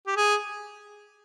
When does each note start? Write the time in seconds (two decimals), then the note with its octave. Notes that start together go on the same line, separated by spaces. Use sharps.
0.07 G4
0.16 G#4